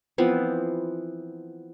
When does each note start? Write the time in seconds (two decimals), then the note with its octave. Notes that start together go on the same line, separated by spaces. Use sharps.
0.18 E3 F3 B3 C4